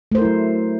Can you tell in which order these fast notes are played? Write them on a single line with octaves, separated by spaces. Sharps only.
A3 C5 A#4 E4 F#3